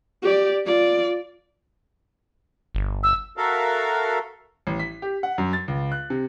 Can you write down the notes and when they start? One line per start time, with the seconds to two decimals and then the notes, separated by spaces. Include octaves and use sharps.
0.22 G4 D5
0.66 F4 D5
2.75 G1
3.03 E6
3.37 F#4 A4 A#4 E5 F5
4.67 A1
4.80 B6
5.02 G4
5.23 F#5
5.38 F#2
5.53 A6
5.68 C#2
5.92 F#6
6.10 C3